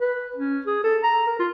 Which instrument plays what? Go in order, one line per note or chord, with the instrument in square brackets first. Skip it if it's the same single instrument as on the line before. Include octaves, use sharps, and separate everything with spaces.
[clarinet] B4
C#4
G#4
A4
A#5
A#4
F4